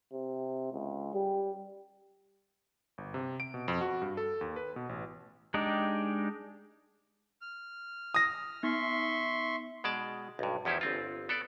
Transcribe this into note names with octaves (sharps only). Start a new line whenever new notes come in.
C3
C#2
G3
G1
C3
D7
B2
F2
F#4
G2
A4
D#2
B4
B2
A1
G#3 D4 D#4 G4
F6
D#6 A#6
B3 D#4 E5 C6 C#6
B2 G#3 D5 A5
B1 G2
E2 F3 C#4 E4 G4 C5
G1 C4 F4
B3 A4 D5